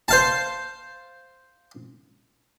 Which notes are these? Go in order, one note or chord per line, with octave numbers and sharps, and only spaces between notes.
C5 F5 A5